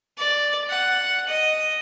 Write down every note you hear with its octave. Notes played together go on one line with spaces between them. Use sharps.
D5
F#5
D#5